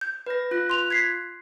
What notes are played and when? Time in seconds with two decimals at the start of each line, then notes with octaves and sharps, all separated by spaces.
0.01 G6
0.26 B4 A#6
0.51 F4 F#6
0.70 C6 F7
0.90 G#6 B6 C7